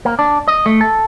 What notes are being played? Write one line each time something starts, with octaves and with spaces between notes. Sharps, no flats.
A#3
D4
D#5
A3
A4